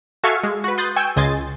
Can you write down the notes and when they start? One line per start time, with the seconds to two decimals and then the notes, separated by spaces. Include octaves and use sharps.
0.24 F#4 A4 E5 F5 G#5 C#6
0.43 G#3
0.64 F#4 B4
0.78 C6 D#6 F#6 G6 A6
0.96 G5 G#5 C#6 E6 G6
1.16 C#2 D#5 G#5 C6 A6